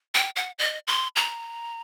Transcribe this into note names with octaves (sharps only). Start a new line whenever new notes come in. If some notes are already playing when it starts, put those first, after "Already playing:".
G5
F#5
D#5
C6
A#5